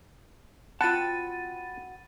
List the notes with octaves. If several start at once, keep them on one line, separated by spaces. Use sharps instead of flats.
C4 F4 F#4 F#5 A5 B5 A6 D#7